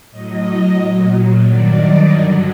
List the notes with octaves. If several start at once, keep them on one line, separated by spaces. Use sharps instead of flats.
A2 F#3 D#5
A#2 F#3
G2 D#3 F#3 D5
D#5
G2 D3 F#3 A#4